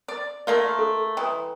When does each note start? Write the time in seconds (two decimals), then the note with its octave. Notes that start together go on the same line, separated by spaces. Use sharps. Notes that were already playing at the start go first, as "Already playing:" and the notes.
0.08 D5
0.47 A3 A#3 F4 A#4 F5
0.79 A4
1.17 E3 G5 A#5 D#6